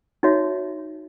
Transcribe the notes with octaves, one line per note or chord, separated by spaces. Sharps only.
D#4 F#4 C#5 E5